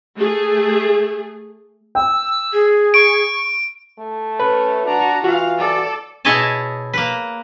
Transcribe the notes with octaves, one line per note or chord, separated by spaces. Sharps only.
A3 G#4
G5 E6
G#4
C#6 D7
A3
C#4 B4
D4 F#4 A#5
E3 F4 F#4 F5
A4 D5
B2 E4 G#4 C#5 D#5 A5
A#3 B4